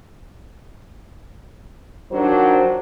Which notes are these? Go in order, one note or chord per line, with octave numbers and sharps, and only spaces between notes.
D#3 F3 F#3 D4 C5